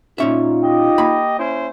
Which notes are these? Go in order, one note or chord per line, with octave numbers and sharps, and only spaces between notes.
A#2 C#4 D#4 F4 E5
G4 D#5
A#3 B5
C#4 E4 C5